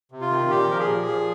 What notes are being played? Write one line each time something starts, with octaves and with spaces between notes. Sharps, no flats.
C3
F4
D#3
A#2 G4
F3 A#4
G#4
A#2
F3